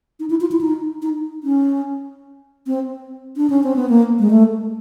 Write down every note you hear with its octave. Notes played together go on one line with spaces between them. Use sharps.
D#4
E4
F4
E4
D#4
D#4
C#4
C4
D4
C#4
C4
B3
A#3
G#3
A3